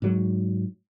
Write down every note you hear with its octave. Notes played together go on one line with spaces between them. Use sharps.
G#2 F#3